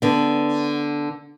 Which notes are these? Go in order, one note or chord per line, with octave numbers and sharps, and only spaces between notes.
D3 B3